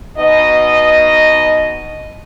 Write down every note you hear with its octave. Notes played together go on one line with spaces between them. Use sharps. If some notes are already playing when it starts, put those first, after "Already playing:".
B2 D#4 D#5